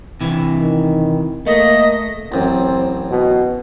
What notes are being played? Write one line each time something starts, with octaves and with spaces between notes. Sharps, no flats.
C3 E3
D#3
A3 A#3 D#5
A1 F#2 C4
B2